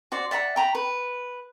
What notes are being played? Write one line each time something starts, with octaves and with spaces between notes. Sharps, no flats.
F#4 C5 D5
D5 E5 F#5 A#5
G5 A#5 B5
B4